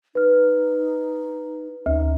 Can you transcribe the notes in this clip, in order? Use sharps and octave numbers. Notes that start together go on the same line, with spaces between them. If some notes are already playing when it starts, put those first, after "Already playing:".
D#4 B4 F6
D2 D#4